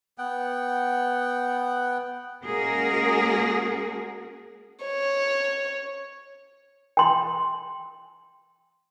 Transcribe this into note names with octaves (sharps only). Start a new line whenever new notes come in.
B3 F#5 G5
G#3 A#3 C#4 F#4 G#4 A#4
C#5
G5 C6